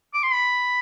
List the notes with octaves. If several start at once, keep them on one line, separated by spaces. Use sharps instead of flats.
D6
C6
B5